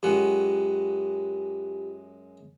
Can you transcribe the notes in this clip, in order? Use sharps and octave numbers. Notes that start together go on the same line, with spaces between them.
F#2 G#3 F4 G4 F#5